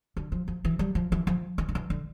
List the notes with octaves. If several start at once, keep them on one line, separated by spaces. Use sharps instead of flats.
D3
F3
F3
E3
G3
F3
E3
F3
E3
D3
E3
D3